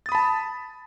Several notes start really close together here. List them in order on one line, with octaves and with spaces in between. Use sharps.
A6 D#6 B5 A5